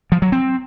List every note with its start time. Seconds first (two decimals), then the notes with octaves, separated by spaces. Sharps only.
0.12 F3
0.22 F#3
0.32 C4